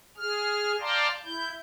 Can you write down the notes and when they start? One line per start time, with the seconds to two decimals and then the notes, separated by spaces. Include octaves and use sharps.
0.17 G#4 F6
0.80 D5 F5 G5 A5 A#5 C6
1.24 E4 G6